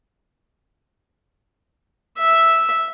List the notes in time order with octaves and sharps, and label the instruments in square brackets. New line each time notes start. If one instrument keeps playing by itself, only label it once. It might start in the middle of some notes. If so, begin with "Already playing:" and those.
[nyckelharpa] E5